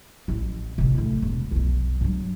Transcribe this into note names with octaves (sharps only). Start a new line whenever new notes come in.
A1 E4
A1 C3
A2 D3
E1
B1 F2
G2 F#3